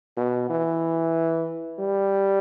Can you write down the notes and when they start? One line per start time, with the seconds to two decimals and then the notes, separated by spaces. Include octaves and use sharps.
0.17 B2
0.49 E3
1.79 G3